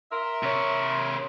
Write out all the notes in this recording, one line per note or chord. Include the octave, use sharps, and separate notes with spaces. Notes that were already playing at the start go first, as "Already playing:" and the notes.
A#4 E5 C6
C3 C#5